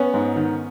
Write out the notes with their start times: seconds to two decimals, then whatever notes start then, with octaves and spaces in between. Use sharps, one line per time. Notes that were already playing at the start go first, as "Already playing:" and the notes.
Already playing: B3 C#4
0.14 G#2
0.36 D#3